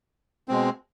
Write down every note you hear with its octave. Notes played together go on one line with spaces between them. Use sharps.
B2 G#3 C4